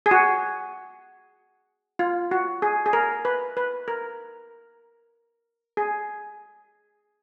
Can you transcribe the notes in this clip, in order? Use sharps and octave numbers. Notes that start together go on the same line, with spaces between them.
G#4
F#4
F4
F#4
G#4
G#4
A#4
B4
B4
A#4
G#4